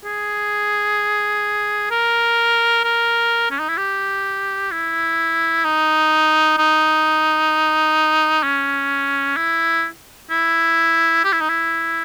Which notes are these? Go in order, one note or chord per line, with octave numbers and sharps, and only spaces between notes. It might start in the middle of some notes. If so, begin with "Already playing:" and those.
G#4
A#4
A#4
C#4
D#4
E4
G4
E4
D#4
D#4
C#4
E4
E4
G4
E4
D#4
E4